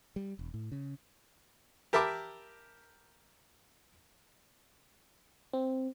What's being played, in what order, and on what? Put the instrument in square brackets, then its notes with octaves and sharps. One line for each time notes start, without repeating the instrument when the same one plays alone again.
[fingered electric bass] G3
E1
A2
C#3
[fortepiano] G4 A#4 E5 A5 B5 D6
[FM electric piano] C4